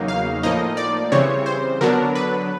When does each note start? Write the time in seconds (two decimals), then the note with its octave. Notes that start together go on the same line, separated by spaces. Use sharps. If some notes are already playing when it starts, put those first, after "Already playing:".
Already playing: E2 C#3 F#3 A#3 D#4
0.08 F5
0.43 A2 F3 A#3 D#4 D#5
0.77 D5
1.12 C#3 E3 G3 C4 C#5
1.46 C5
1.81 D3 F#3 B3 D4 A#4
2.15 B4